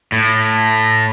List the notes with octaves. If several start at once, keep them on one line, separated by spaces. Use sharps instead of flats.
A2